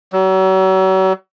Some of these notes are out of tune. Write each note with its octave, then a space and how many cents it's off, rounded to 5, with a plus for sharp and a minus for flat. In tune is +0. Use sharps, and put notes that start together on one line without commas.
F#3 +40